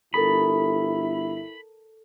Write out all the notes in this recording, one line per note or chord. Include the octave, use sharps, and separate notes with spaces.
G1 E4 A4 A#4 B5 D#6